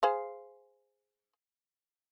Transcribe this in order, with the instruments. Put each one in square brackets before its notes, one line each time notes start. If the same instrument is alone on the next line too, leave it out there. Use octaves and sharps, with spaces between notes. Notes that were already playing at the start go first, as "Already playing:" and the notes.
[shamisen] G#4 C5 F5